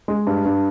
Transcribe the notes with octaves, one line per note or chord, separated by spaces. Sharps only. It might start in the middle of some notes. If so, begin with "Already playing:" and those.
G#3
G2
G2